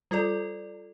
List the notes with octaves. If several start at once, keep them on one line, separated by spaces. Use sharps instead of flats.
G3 F4 A4 D5